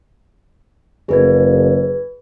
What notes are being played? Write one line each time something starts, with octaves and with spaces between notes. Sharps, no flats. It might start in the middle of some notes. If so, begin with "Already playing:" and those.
F#1 G#4 B4 G#6